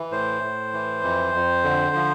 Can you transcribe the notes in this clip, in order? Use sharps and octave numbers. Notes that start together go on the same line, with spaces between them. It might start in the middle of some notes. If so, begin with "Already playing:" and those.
Already playing: E3
A2 C5
A2
E3
F2
F2
D3
F3